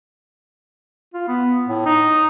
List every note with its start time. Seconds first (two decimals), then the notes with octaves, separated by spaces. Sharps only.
1.14 F4
1.28 B3
1.68 A2
1.86 D#4